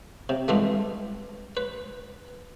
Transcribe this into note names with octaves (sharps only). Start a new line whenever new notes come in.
C3
G2 E3 G#3 A3
B4